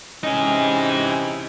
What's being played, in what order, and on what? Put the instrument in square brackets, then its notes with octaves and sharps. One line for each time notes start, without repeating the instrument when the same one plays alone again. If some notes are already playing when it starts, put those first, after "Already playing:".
[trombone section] C3 E3 [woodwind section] C#4 [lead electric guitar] D#4 G#4 [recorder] D#5